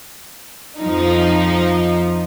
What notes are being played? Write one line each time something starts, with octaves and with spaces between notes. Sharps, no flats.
F2 F3 D#4